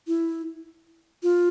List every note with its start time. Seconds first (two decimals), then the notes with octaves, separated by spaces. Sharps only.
0.07 E4
1.23 F4